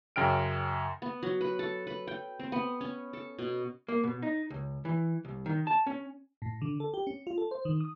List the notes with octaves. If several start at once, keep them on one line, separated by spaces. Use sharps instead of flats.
F#2 C#3 G5 F6 D7
B3
F#3
B4
A4
B4
G5
C4
B3
C#4
A4
B2
A#3
B2
D#4
C#2
E3
C2
D#3
A5
C#4
A2
D3
A4
G4
C#4
F4
A4
C5
D#3
D#6